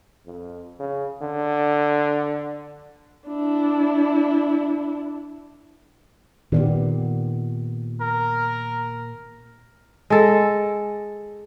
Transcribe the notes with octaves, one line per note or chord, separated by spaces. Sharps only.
F2
C#3
D3
D4 E4
A#2 D#3 B3 G4
A#4
G#3 A4